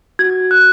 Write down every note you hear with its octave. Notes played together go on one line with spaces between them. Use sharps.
F#4 G#6
F#4
F#6